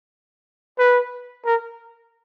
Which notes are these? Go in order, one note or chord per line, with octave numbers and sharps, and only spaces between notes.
B4
A#4